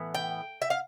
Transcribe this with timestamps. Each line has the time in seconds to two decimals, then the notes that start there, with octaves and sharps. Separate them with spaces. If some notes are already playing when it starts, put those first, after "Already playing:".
Already playing: A2 E3 B3
0.14 G5
0.62 E5
0.70 F5